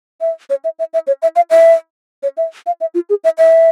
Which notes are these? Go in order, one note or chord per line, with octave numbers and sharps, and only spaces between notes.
E5
C#5
E5
E5
E5
C#5
E5
F5
E5
C#5
E5
F5
E5
F4
G#4
E5
E5